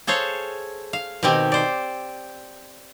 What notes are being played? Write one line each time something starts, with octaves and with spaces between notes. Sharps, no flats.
G#4 A4 C5 C#5 F5
F5
B2 D#3 C4 D#4 G4 G#5
C5 D5